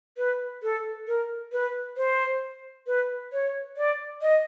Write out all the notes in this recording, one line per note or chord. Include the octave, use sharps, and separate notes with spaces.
B4
A4
A#4
B4
C5
B4
C#5
D5
D#5